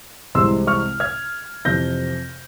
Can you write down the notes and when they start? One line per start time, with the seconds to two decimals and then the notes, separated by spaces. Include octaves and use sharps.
0.35 C2 C3 E3 G#3 C6 E6
0.67 C#6 F6
1.00 F6 G#6
1.65 F2 C3 E3 G6 A#6